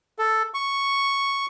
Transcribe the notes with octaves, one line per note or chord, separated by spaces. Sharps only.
A4
C#6